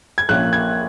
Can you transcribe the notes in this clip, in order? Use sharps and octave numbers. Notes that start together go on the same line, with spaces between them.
G#6
A#1 A#2 A#3 C#4 F#6
G#6